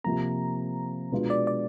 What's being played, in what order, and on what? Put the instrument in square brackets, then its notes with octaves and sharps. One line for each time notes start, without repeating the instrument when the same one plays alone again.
[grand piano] C3 F3 A#3 [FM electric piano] A#5
[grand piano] B2 G#3 B3 D4 F4
[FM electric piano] D5
D5